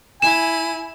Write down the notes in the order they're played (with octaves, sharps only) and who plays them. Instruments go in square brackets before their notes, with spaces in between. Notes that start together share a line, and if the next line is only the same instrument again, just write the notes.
[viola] E4 [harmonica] G#5 [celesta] E7